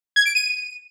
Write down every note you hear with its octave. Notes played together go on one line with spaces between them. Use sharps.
G#6
D7
D#7